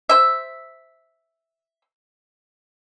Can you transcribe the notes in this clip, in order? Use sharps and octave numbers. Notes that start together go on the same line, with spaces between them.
C5 E5